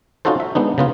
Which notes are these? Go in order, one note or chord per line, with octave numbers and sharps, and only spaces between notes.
C#4 D#4 F4 F#4 A4 C5
E5
G#3 B3 D4 D#4
C#3 B3 F4